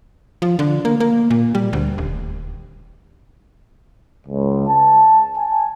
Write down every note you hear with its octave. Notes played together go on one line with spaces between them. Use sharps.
F3
D3
A#3
A#3
A#2
G3
D2
D#1
C#2
A5
G#5